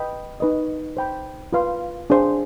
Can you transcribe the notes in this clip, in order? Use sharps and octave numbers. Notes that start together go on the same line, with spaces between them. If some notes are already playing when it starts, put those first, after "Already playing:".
Already playing: B4 D#5 G5 B5
D#4 B4 D#5
C5 G5 B5
F4 B4 F5 C6
D4 G#4 C5 F5